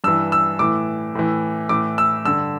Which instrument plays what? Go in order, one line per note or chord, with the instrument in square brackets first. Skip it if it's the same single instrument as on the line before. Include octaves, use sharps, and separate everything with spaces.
[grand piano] G2 E3 E6
E6
A2 E3 D6
A2 E3
A2 E3 D6
E6
G2 D3 E6